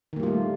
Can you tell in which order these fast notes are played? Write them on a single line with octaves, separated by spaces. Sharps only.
D#3 A#3 G3 F4 A3